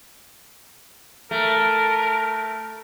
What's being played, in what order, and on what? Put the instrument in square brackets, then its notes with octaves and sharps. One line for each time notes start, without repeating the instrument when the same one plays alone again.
[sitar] A3 [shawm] A#4